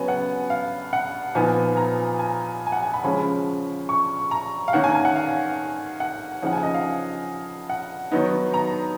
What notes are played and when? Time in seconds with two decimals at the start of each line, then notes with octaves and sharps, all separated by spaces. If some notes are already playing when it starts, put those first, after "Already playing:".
Already playing: C#3 F#3 B3 G#5
0.08 F#5
0.50 F5
0.93 F#5
1.35 A#2 F3 B3 D#4 G#5
1.77 A#5
2.19 G#5
2.67 G#5
2.72 F#5
2.83 G#5
2.93 B5
3.04 C#3 F3 G#3 C#4 B5
3.89 C#6
4.31 A#5
4.68 F5
4.73 D#3 A#3 C#4 F#5
4.84 G#5
4.95 G#5
5.05 F#5
5.16 F5
6.00 F#5
6.42 C#3 F3 A#3 D#4 F#5
6.53 G#5
6.63 D#5
6.74 F5
7.70 F#5
8.12 D#3 F#3 B3 D#4
8.54 A#5